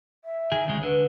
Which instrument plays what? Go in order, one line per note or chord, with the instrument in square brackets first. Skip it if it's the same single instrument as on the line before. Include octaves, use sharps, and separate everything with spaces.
[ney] E5
[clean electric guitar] D#3 G#4
[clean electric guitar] D2 C#3 G#3 [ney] C#4
[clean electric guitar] D3 [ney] B4